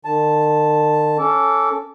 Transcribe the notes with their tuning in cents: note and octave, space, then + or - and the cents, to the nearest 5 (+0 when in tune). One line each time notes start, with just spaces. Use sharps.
D#3 -45 A5 +0
C#4 +0 A4 +0 D6 -25